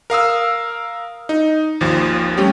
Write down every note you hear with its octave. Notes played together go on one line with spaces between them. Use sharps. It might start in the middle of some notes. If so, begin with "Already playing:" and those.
A#4 F5 D#6 E6
D#4
G#1 D#2 F3
G3 A3 C#4 G4